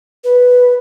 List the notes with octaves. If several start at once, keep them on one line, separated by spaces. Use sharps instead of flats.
B4